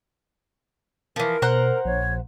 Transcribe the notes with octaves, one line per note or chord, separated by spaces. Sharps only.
E3 F3 A#4
B2 C5 F#5 A#5
A#1 C#5